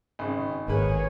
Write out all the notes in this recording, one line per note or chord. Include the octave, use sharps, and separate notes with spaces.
G#1 C#3
G#1 A#3 G#4 B4 C#5